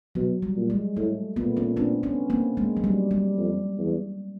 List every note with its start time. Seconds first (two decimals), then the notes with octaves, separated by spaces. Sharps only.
0.15 B2 F#3
0.42 G3
0.56 A#2
0.70 G#3
0.97 A2 A3
1.36 A#2 A3 B3
1.57 B3 C#4
1.77 C4 D4
2.03 B3 C#4
2.30 A#3 C4
2.57 G#3 A#3
2.77 F#3
2.84 G3
3.11 G3
3.37 F2
3.78 E2